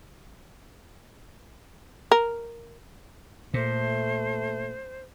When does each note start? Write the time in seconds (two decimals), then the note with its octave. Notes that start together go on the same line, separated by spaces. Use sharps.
2.11 A#4
3.54 A#2 A3 C5